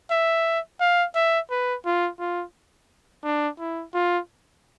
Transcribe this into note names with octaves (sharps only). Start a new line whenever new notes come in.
E5
F5
E5
B4
F4
F4
D4
E4
F4